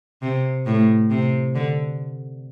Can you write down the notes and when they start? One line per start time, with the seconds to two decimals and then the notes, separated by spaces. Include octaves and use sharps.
0.23 C3
0.66 A2
1.10 C3
1.55 D3